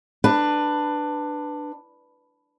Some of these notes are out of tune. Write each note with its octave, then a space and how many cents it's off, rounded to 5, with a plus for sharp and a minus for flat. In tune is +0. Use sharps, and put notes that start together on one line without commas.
D4 +15 B4 +0